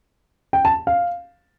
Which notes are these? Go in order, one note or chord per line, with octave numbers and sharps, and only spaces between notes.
G5
A5
F5